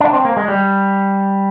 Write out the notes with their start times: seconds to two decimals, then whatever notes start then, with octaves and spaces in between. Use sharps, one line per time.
0.01 D4
0.13 C4
0.25 A#3
0.37 G#3
0.48 G3